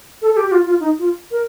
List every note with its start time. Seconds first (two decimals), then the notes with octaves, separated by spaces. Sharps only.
0.22 A4
0.32 A4
0.37 G4
0.47 G4
0.52 F4
0.66 F4
0.80 D#4
0.99 F4
1.31 A#4